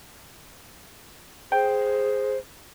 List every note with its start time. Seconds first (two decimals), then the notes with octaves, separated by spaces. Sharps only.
1.52 G#4 C5 G5